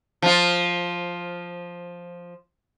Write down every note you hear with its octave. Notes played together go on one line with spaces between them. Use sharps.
F3 F4